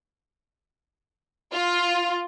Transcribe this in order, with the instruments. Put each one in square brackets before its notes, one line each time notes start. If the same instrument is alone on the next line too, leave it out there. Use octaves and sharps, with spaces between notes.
[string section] F4